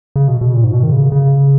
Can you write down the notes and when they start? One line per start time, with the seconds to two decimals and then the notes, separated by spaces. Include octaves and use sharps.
0.16 C#3
0.28 B2
0.41 B2
0.54 A#2
0.64 G#2
0.73 B2
0.83 D#3
0.92 C#3
1.12 C#3